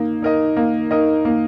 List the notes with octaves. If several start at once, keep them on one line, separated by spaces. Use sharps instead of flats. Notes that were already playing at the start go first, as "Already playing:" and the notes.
Already playing: A#3 D#4
D#4 A#4 D#5
A#3
D#4 A#4 D#5
A#3